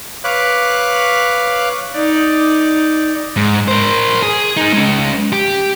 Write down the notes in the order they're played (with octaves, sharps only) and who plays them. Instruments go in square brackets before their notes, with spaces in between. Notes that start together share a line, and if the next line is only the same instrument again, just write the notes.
[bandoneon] B4 C#5 F5 B5 D6 F#6
[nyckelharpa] D#4 D5
[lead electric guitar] G#2
A#4 C5
G#4
D#4 G#4
G#3 C#4
G4